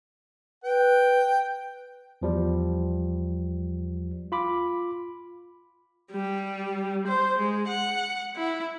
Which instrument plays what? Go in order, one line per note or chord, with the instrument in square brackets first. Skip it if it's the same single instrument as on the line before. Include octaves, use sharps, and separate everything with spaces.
[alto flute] B4 [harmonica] G5
[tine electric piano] E2 F3 G3
F4 B5 D6
[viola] G3
C5
G#3
F#5
E4